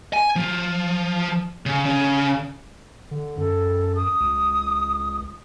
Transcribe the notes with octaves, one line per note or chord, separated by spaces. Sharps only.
G#5
F3
C#3
C#3
D3
F#2 A4
D#6
C#2